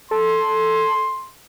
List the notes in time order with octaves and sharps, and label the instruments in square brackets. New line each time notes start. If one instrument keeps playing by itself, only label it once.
[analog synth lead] A4 [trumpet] C6